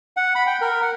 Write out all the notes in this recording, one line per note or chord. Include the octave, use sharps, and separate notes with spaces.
F#5
B5
G5
A#4
F#5